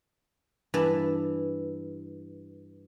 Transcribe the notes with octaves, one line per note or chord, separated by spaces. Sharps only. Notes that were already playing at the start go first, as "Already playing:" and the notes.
G2 E3 E4 B4 A5